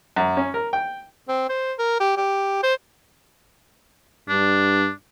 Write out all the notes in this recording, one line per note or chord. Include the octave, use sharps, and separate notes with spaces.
F#2
C#4
A#4
G5
C4
C5
A#4
G4
G4
C5
G2 D4